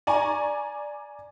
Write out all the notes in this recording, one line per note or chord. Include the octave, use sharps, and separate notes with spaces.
D5 G#5 A#5 C#6